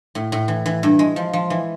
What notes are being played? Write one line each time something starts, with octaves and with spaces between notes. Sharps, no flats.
A2
A2
E3
E3
G2
G#3
F3
F3
E3